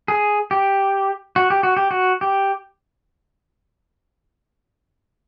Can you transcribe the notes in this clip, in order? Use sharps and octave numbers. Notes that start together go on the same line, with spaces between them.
G#4
G4
F#4
G4
F#4
G4
F#4
G4